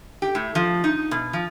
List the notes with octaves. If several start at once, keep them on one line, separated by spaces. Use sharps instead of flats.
G4
A2
F3
D#4
B2
F3